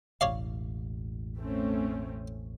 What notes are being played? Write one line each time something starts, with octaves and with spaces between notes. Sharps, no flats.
E1 A1 C#5 D5 F5
A3 C4 C#4